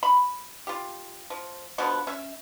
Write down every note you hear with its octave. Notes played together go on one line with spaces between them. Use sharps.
B5
F4 G4
F3
B2 D3 F3 B3
C#4 E5